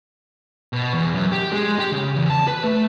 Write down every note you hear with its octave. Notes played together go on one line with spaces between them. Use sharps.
B2
E2
F#2
G4
G#3
G4
C#3
E2
A5
B4
A3